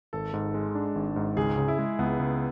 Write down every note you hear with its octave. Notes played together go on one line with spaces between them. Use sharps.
G#1 A4
G#2
G#3
D4
G#1
G#2
C#2 G#4
C#3
E4
G#3
C#2 B3
C#2